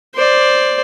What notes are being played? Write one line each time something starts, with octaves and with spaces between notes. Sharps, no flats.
C5 D5